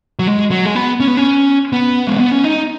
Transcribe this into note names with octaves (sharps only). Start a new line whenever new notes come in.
F#3
G#3
F#3
G#3
B3
C#4
B3
C#4
B3
G#3
B3
C#4
D#4